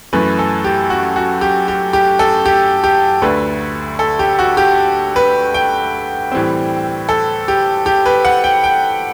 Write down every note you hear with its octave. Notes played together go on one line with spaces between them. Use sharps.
F#2 E3 A3 B4
A4
G4
F#4
F#4
G4
G4
G4
A4
G4
G4
D2 D3 A3 B4
A4
G4
F#4
G4
B4
G5
A2 E3 G3 C4
A4
G4
G4
B4
F#5
G5
G5